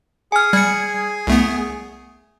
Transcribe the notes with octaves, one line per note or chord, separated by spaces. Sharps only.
G#4 G#5 F6
G3 G#6 C#7
C2 A3 B3